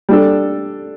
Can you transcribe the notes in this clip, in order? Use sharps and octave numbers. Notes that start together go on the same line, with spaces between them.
G3 D4 A4